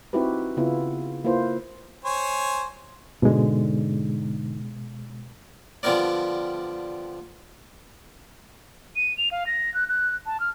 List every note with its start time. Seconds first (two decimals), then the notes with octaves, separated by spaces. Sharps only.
0.13 C4 D#4 E4 F#4 G4 B4
0.57 C#3 B3 E4 F4
1.24 A#3 E4 F4 B4 C5
2.04 C5 C#5 G#5
3.22 G#2 B2 D3 G#3
5.83 D3 F3 G3 B3 A#4 D5
8.96 D#7
9.18 F7
9.31 F5
9.46 A#6
9.74 F#6
9.89 F#6
10.26 A5
10.40 F6